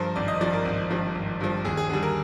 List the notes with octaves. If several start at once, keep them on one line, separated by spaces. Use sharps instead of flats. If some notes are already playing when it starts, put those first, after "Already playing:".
Already playing: G2 F3 A#4 C5
G#1 D5
D#5
G2 F3 D5
A#4
G#1
G2 F3
G#1
G2 F3
D#2 G#4
G#4
D3 G3 G#4
A#4